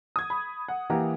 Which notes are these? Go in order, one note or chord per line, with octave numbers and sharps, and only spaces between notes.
D#6 G#6
B5
F#5
E3 A#3 G4 F#5 A#5